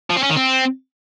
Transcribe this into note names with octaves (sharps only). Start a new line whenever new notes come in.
F3
C4
C#4
D#3
C4